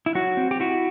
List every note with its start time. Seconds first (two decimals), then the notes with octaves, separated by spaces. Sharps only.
0.06 E4
0.15 F#3 F#4
0.37 C4
0.51 G4
0.60 E4 F#4